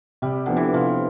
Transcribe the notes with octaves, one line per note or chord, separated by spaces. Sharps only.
C3 G3
D3 F3 B3 D4
E3
C3 F3